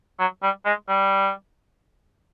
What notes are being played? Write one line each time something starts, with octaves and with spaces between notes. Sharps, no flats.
F#3
G3
G#3
G3